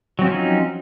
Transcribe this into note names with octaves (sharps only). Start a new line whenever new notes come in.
F3 F#3 C4 C#4 D#4